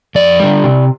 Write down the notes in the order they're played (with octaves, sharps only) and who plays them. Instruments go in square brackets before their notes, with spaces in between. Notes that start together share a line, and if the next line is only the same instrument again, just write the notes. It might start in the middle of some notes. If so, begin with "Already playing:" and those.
[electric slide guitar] F2 D5
D3 G3
C3